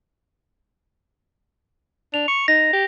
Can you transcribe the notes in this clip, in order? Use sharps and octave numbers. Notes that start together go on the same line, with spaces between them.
D4 F7
C#6
D#4 A#6
G4